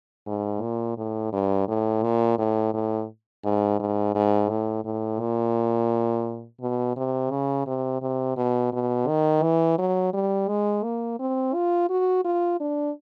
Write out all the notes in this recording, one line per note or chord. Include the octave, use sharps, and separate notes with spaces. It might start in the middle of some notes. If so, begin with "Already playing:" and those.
G#2
A#2
A2
G2
A2
A#2
A2
A2
G#2
G#2
G#2
A2
A2
A#2
B2
C3
C#3
C3
C3
B2
B2
D#3
E3
F#3
G3
G#3
A#3
C4
F4
F#4
F4
D4